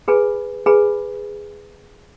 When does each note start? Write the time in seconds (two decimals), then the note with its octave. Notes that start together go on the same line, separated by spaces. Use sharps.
0.08 G#4 B4 G#5 B5
0.66 G#4 B4 G#5 B5